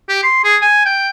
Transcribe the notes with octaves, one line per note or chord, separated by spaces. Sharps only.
G4
C6
G#4
G#5
G5